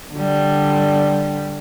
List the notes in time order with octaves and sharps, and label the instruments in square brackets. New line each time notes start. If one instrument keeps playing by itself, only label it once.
[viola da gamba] D3 G3